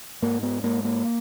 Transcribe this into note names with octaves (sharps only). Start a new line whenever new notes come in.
G#2 A#3
B3
G#2 A#3
A#3